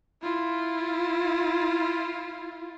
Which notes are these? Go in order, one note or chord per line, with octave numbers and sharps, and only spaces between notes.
E4 F4